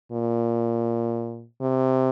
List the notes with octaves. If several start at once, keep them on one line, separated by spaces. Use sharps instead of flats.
A#2
C3